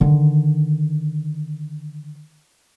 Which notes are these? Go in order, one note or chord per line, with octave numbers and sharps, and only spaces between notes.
D3 D#3